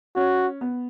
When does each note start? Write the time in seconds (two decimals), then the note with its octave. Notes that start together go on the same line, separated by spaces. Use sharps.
0.16 C#4 F#4
0.61 B3